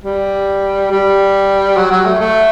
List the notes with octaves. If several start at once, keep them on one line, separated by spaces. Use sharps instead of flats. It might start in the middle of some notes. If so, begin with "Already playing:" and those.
G3
G3
F#3
F#3
A3
A3